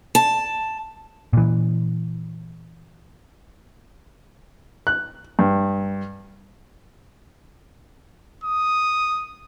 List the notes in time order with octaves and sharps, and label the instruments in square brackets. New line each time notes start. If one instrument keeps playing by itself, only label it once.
[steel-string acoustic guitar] A5
[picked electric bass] A#2 E3
[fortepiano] F#6
G2
[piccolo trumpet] D#6